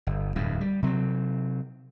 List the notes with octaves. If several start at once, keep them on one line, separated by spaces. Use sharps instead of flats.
G1
D1 E2 G2
G3
C3 F#3 G#3 C4